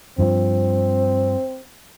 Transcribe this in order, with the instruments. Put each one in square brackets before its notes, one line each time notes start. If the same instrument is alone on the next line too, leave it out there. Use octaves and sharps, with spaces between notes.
[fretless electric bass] G2 F3 [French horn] C4